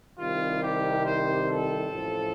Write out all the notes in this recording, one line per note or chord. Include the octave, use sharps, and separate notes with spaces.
C2 C3 D#3 G3 F4
G4
C5
A4
A1 A2 F3